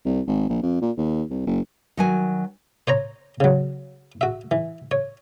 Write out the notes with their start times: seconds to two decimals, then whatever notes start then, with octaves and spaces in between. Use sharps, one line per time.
0.05 C2
0.27 G#1
0.49 A#1
0.62 F2
0.81 A#2
0.97 D#2
1.30 C2
1.47 F#1
1.97 D#3 F#3 G#5
2.88 C5 C#5 A#5
3.40 C#3 F#3
4.21 F#4 E5
4.51 E3
4.91 C#5